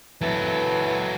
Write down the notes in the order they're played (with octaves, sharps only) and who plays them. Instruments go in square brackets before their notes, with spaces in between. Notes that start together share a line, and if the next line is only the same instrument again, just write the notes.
[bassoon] E3 [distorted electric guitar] F#3 A4